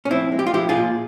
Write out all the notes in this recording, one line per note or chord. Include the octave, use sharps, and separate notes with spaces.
C#4
F3 C4 E4
G#3
G4
F4
F3 E4 G4
F4 G#4
A#2